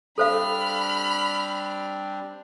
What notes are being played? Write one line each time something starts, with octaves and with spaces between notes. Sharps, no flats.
G3 C4 D4 A4 C5 F5 B5 F6